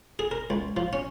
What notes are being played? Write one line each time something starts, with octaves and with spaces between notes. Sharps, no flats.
G#4
A#4
C#2
F3
C#4